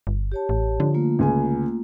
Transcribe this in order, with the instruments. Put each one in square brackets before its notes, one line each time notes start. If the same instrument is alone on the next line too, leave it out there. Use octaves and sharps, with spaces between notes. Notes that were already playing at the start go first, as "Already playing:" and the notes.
[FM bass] G1
[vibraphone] G4 C#5 A5
[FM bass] A1
[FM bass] D3 [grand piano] F3
[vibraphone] A3 A#3 F4
[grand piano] C#2 G#5